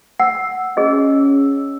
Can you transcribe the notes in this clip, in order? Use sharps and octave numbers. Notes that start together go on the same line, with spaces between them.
F#5 E6
C#4 G#4 D#5